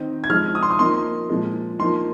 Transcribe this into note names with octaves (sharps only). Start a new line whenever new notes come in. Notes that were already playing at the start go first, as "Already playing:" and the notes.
Already playing: D#3 C4 D#4
G#6
F3 G#3 D#4 F6
D#6
C6
D#6
F3 A#3 D#4 C6
A#2 F3 G#3
F3 A#3 D#4 C6